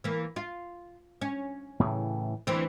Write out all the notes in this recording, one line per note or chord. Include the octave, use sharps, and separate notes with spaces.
E3 A#3
F4
C#4
A2 C#3 E3
D2 E3 C4